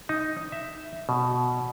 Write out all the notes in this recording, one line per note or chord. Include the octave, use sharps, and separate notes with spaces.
D#4
E5
B2